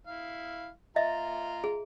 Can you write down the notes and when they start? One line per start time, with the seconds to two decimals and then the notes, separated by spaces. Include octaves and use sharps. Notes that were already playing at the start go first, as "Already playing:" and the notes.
0.07 E4 F5
0.96 F4 D#5 E5 A#5
1.64 G#4